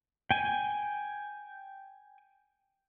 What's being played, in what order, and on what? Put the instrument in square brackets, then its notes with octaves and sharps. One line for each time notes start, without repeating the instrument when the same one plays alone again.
[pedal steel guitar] G5 G#5